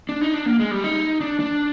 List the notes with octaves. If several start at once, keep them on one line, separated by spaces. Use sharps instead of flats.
D4
D#4
D4
A#3
G#3
G3
D#4
D4
D4